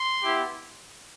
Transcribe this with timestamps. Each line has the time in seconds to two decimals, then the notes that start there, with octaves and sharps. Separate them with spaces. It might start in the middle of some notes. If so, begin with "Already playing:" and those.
Already playing: C6
0.22 B3 E4 G4